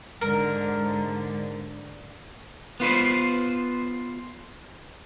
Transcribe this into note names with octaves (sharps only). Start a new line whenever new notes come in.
G#2 D3 A#4
B3 F4 B4 C5